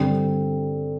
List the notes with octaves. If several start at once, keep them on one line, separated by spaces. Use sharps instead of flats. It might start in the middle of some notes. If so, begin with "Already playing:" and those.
Already playing: G2 D3 G3 C4